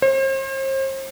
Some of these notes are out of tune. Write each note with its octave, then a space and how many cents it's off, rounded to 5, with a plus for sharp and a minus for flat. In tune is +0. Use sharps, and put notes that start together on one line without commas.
C5 +40